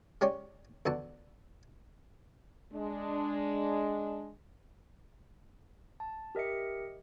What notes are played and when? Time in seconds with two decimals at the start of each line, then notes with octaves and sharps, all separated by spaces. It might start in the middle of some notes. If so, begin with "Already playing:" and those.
0.21 G#3 C#4 G4 C#5 D5
0.86 E2 D3 F#4 A5
2.74 G#3 D4
6.00 A5
6.35 G4 A#4 D#5 E5 C#7